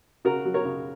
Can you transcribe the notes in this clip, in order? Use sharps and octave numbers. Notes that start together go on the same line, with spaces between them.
C#3 F#4 A#4
F#3
A#4 C#5
C#3